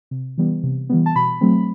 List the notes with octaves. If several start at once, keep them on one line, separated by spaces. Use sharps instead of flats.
C3
E3 G3 B3
C3
E3 G3 B3
A5
B2 B5
F#3 A3 C4